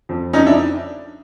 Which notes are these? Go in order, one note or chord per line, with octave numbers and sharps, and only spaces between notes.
F2
F2 C#4 D#4
D4 E4